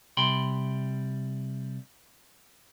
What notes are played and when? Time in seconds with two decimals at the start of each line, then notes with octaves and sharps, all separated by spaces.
0.17 C3 G3 G5 B5 C6